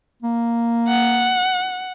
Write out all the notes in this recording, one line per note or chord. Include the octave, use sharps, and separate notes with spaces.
A#3
F#5